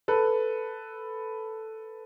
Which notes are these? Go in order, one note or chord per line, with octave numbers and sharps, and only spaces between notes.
A4 B4